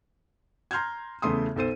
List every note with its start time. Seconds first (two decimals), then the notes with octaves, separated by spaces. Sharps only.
0.71 A#5 C6 F6 G6 G#6
1.22 E2 C#3 A3 C6 D#6
1.56 B1 A4 C5 D#7